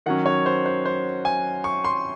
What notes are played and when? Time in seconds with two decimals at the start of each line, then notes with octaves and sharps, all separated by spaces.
0.06 D#3 F#3 C#4 F#5
0.26 C#5
0.46 C5
0.66 C5
0.86 C5
1.25 G#5
1.64 C#6
1.84 C6